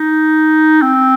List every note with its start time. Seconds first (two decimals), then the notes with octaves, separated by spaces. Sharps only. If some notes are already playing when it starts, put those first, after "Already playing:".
Already playing: D#4
0.82 C4